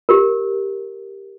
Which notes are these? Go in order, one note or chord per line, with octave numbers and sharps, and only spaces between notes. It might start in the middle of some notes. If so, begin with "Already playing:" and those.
G4 A#4